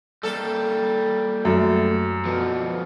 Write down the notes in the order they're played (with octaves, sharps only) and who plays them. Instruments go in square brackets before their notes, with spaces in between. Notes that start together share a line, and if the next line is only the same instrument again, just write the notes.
[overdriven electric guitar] G3 A#3 [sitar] A4
[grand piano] F#2 [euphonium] A3
[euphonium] B2 [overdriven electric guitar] D3 F3